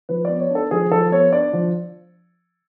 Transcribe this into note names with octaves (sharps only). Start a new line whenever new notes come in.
F3 B4
B3 D5
C#5
D4 A4
F3 G#4
F3 A4
B3 C#5
D4 D5
F3